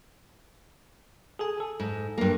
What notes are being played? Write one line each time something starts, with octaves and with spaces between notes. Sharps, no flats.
G#4 A4 G#5
A4
G#2
G2 A#3